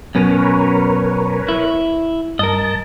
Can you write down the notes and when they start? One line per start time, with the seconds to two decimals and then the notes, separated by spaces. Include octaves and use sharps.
0.15 F#2 B2 C#4 A#4 B4 C#5
1.49 E4
2.39 G2 A#4 D#5 A5